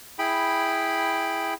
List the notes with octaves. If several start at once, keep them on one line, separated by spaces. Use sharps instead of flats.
E4 G#4 G5 B5